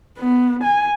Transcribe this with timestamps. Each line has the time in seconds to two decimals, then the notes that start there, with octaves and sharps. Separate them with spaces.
0.19 B3
0.63 G#5